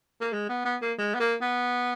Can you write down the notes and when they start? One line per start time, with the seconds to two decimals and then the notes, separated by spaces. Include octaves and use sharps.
0.21 A#3
0.32 G#3
0.49 B3
0.65 B3
0.81 A#3
0.98 G#3
1.14 B3
1.20 A#3
1.41 B3